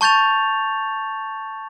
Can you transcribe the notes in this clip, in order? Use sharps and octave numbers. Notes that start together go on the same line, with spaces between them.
A5 C#6 G6 A6 F7